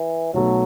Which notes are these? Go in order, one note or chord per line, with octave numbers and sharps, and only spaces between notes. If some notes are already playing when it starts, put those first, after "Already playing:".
Already playing: E3
B1 B2 F#3 A3